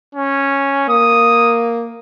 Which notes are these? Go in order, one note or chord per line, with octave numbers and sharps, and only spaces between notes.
C#4
A#3 D#6